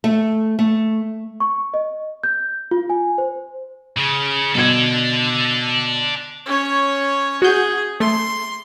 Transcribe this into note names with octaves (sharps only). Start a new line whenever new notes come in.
A3
A3
C#6
D#5
G6
F4
G#5
C5
C#3
B2 D4 A4 G#6
C#4 C#5
F#4 G#4 G6
A3 C6